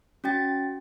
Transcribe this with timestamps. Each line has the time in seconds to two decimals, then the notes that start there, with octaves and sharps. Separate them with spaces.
0.24 C#4 F#4 G5 A6